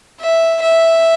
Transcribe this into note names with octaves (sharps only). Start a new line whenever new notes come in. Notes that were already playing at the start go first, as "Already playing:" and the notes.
E5
E5